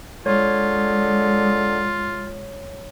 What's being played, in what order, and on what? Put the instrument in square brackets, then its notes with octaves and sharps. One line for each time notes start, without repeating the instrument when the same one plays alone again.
[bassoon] D3 [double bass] G#3 [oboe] F4 [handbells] C#5